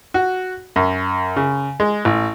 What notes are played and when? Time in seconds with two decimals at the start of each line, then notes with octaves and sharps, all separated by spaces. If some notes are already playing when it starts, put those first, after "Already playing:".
0.14 F#4
0.76 F#2
1.36 C#3
1.80 G#3
2.05 A1